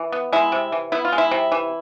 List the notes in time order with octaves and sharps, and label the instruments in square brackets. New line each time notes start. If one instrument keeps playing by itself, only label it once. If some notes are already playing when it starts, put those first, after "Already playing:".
Already playing: [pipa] E3
B3
G#3 E4
C3
E3
B3 E4
F4
G#3
E4
C3
E3